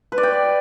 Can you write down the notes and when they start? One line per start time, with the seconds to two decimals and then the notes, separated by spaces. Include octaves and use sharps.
0.12 B4
0.18 D5
0.23 G5